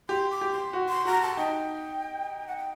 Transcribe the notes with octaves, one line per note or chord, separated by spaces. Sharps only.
G4 C6
D6
G4
C6
F#4
C6
F#4 A#5
A5
D#4 G5
F#5
G5